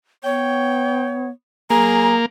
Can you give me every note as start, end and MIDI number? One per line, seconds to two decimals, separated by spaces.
0.24 1.30 59
0.24 1.26 73
0.24 1.15 79
1.70 2.15 54
1.70 2.26 58
1.70 2.16 68
1.70 2.15 82